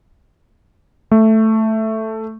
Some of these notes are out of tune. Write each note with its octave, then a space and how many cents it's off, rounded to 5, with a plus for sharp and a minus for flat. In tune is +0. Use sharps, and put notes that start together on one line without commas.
A3 +0